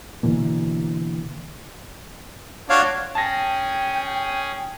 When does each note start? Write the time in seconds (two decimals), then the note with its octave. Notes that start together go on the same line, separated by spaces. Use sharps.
0.23 B2 D3 E3 A#3
2.69 D4 F4 F#4 C#5 F5
3.15 C#4 G#4 G5 A5 A#6